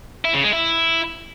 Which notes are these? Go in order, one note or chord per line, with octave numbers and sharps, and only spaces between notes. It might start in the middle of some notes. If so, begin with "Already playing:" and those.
E4
C#3
G#3
E4